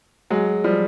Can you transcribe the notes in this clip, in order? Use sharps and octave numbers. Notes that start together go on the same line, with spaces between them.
F#3 G#3
F3 G3